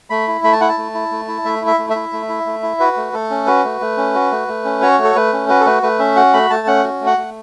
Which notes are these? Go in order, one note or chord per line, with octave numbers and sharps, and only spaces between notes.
A3 B5
E4
A3 B5
A5
E4 F#5
A5
A3
E4
A3
E4
A3 E5
E4
E5
A3
E5
E4
A3
E4
A3
E4
F#4 B4
A3
A3 A4
C#4
F#4 B4
A3
A3
C#4
F#4
A3
A3
C#4
F#4 C#5
A3
A4
A3 B4
C#4
F#4 B4
A4
A3 B4
A3 B4
C#4 E5
F#4 F#5
A3 B5
A3 A5
C#4 F#5
F#4
A3
F#5
A3